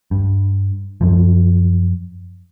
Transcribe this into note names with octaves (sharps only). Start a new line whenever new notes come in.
G2
F#2 F3